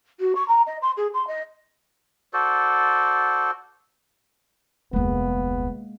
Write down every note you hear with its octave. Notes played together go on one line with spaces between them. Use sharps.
F#4
C#6
A#5
D#5
C6
G#4
C6
D#5
F#4 A4 C5 D5
F1 D2 G#3 A#3 B3